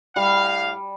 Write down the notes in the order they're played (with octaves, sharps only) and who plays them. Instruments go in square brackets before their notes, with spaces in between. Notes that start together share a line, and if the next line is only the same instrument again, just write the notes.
[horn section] A2 F5 [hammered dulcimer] G3